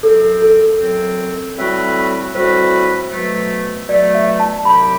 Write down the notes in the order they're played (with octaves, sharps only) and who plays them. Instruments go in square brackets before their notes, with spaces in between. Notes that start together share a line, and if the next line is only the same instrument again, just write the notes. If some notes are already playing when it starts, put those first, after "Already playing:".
[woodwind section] F#2 F#3 C4 [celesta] A4
[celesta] A4
[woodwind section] F#2 F#3 C4
A2 G3 C4 F#4 B4
[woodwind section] A2 G3 C4 F#4 B4 [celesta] C5
[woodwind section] B2 F#3 A3
[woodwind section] B2 F#3 A3 [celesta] D5
[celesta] E5
A5
[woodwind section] C2 C3 F#3 C4 G4 [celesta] B5